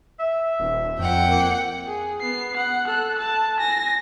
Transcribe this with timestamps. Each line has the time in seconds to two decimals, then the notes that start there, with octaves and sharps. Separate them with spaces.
0.19 E5
0.59 D#1
0.99 F2 F#5 G5
1.28 A#3
1.87 G#4
2.21 B3 C7
2.57 F#5
2.87 A4 F#6
3.19 A5
3.57 G#5 A#6